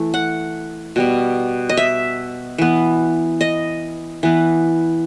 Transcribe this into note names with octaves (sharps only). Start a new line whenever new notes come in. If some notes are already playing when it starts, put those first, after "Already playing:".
Already playing: E3 A3
F#5
B2 G3 B3
D#5
E5
E3 B3
D#5
E3 B3